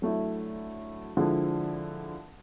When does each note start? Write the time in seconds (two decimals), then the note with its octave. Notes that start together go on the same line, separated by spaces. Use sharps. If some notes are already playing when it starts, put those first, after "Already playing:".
0.02 F#3 A3 D4 E4
1.17 D3 F3 G#3 E4